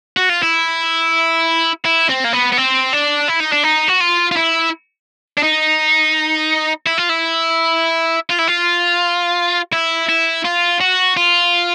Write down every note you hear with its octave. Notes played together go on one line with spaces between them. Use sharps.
F#4
F4
E4
E4
C4
A#3
B3
B3
C4
D4
E4
D#4
D4
D#4
F#4
F4
F4
E4
D4
D#4
E4
F4
E4
F4
E4
F4
E4
E4
F4
F#4
F4